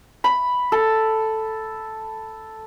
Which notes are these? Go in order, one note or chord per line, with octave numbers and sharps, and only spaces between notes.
B5
A4